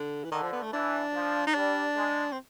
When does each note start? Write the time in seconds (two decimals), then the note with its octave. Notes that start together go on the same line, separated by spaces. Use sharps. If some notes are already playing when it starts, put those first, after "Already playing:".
Already playing: D3
0.24 E3
0.32 D3 D#3
0.42 F3
0.53 B3
0.63 A3
0.72 E3 D4
1.13 F3
1.47 D#4
1.55 G3 D4
1.96 G#3
2.32 C4